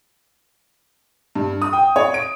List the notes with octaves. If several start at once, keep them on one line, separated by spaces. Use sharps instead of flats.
G2
D#6
G5
C#5
D7